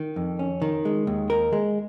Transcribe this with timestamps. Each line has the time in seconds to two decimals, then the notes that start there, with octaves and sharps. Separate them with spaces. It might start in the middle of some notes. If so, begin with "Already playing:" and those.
Already playing: D#3
0.16 F2
0.39 C#4
0.62 D#3
0.85 G#3
1.07 D#2
1.30 A#4
1.53 G#3